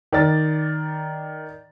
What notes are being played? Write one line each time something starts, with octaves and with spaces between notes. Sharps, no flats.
D#3 D5 A6